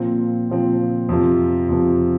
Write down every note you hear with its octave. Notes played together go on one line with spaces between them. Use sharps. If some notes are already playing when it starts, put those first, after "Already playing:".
Already playing: A#2 F3 C4
A#2 F3 C4
F2 C3 F3
F2 C3 F3